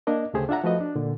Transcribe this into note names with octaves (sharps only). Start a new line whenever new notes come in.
A#3 D4 A#4 D#5
D2 C#3 A3 G4 G#4 C5
D4 F4 E5 F#5 A#5
F3 A3 F#4 B4 D#5
D4
A#2 D3